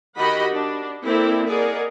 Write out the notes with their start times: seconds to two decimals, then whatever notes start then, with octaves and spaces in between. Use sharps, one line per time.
0.19 D#3 F#4 G4 D#5 F#5 B5
0.53 D4
1.04 A#3 C4 E4 A4 D5
1.48 G#4 A#4 D5 D#5 F#5